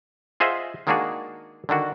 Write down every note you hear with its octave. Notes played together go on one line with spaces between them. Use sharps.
F4 G#4 C5 D#5 E5 F#5
D#3 G#3 A#3 D4 F#4 G#4
D3 D#3 D4 F#4